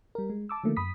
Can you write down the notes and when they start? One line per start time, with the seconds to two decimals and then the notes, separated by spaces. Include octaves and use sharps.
0.15 G3 A#4
0.30 G#3
0.49 A5 D6 E6
0.64 D3 D#3 F3 A3 A#3
0.76 F#2 B5 D#6 B6